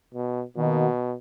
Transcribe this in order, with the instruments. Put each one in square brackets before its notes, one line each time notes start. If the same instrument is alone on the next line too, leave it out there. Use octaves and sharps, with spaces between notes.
[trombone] B2
[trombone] B2 [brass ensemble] D#3 A#3 D#4 F#4